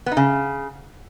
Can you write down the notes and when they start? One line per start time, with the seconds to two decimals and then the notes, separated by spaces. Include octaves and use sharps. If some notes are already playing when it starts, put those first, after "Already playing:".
0.06 B3
0.12 D#4
0.17 C#3